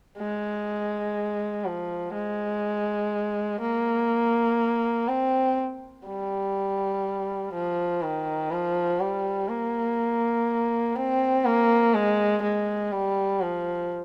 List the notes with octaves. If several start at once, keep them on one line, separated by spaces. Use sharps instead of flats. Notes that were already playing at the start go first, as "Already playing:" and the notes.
G#3
F3
G#3
A#3
C4
G3
F3
D#3
F3
G3
A#3
C4
A#3
G#3
G#3
G3
F3